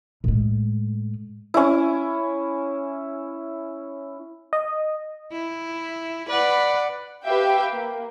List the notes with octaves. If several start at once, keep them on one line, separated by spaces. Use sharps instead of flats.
A2 G#3
C#4 E4
D#5
E4
B4 D5 F#5
G4 B4 E5 F5 G5
A#3